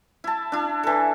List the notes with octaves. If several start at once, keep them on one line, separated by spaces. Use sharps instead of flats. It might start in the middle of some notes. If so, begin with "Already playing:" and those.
E4 A5
D4 E4
E3 A4